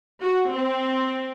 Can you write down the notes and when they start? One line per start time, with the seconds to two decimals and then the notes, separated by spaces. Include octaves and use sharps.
0.22 F#4
0.55 C4